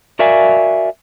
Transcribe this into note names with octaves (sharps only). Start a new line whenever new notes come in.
F#4 A#4 D5 E5 F5 G#5